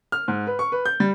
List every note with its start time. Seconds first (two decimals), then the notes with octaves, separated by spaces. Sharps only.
0.12 F6
0.28 G#2
0.47 B4
0.59 C#6
0.72 B4
0.86 G6
1.00 G3